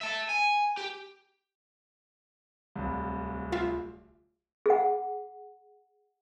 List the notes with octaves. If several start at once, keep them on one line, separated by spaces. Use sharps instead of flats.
E5 A5
G#5
G4
D1 C2
F4 E5 F5
G#4 F#5